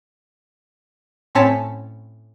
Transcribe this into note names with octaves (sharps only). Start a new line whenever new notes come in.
A2 C4 C#4 C#5 A5 B6